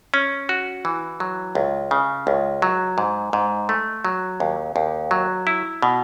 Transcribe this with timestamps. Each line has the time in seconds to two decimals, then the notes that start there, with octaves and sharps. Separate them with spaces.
0.14 C#4
0.49 F#4
0.85 E3
1.20 F#3
1.55 C#2
1.91 C#3
2.27 C#2
2.62 F#3
2.98 G#2
3.33 G#2
3.69 A3
4.05 F#3
4.40 D#2
4.76 D#2
5.11 F#3
5.47 E4
5.82 B2